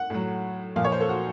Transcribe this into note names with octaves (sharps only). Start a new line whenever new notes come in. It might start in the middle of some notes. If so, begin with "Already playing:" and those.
Already playing: F#5
A2 F#3
A#2 F3 F5
C#5
C5
A4
F#4